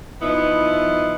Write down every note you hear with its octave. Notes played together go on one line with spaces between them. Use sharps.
F3 B3 D#4 E4